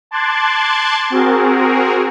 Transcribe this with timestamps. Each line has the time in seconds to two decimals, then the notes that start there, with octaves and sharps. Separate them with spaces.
0.11 A5 C6 D6 F#6 G#6 A6
1.10 C4 F#4 G#4 A#4